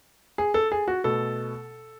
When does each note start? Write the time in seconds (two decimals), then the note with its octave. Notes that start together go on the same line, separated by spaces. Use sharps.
0.38 G#4
0.54 A4
0.72 G#4
0.88 F#4
1.04 B2 A3 A4